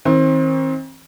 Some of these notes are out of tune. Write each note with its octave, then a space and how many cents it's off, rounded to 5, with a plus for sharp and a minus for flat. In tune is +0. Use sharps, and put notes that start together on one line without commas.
D#3 +45 C4 +25